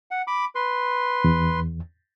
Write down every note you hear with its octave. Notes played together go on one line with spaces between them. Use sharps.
F#5
B5 D6
B4 C6
E2